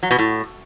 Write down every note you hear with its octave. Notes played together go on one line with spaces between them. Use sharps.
F#3
B2
A2